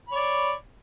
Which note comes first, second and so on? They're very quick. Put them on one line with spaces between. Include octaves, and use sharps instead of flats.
B5 C#5 D5